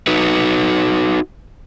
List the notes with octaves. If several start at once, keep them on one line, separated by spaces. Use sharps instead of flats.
D#4 F#4 B4